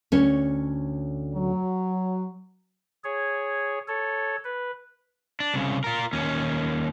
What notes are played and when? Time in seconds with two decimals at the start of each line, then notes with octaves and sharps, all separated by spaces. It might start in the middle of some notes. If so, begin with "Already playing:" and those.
0.12 D2 C#4 C#5
1.34 F#3
3.04 G#4 C#5
3.88 A4 C#5
4.45 B4
5.40 D4
5.54 C2 C#3
5.84 F4 A#4
6.13 D#2 C#4